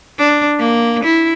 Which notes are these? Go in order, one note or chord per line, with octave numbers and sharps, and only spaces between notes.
D4
A#3
E4